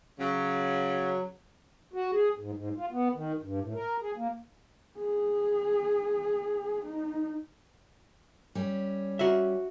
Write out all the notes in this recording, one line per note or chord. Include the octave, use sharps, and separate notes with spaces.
C#3 F#3
F#4
G#4
G#2
G#2
F4
B3
D#3
G2
A2
A#4
G#4
A#3
G#4
D#4
G3 C#4
F#4 E5